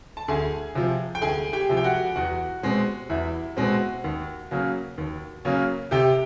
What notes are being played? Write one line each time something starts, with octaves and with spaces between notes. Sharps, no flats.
A5
D2 G#4 G#5
C3 F3
G5
D2 G#4 G#5
G4 G5
C3 F3
G5
F#4 F#5
E2 F#4 F#5
B2 G#3 C4
E2 E4 E5
B2 G#3 C4 F#4 F#5
D#2
C#3 F#3 A#3 C#4
D#2
C#3 F#3 A#3 C#4
C3 G4 G5